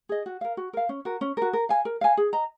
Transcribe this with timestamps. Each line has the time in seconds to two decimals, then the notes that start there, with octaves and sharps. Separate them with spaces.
0.09 G#4 D#5
0.26 F#4
0.41 A#4 F5
0.57 F#4
0.73 A#4 F5
0.89 C#4
1.05 F#4 A#4
1.21 C#4
1.37 F#4 A#4
1.53 A#4
1.69 F5 G#5
1.85 A#4
2.01 F5 G#5
2.17 G#4
2.33 D#5 A#5